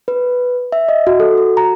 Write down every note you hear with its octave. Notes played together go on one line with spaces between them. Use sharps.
B4
E5
D#5
F#4
A4
F#4
A#5